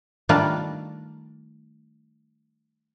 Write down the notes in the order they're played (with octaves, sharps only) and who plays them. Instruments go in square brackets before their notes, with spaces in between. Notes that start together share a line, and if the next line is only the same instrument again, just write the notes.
[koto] D#3 G3 A3 A#3 D4 F4